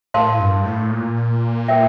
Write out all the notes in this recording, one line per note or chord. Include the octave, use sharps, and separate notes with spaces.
A2 A#4 F5 A5 C6
G2
A2
A#2
A#4 E5 G5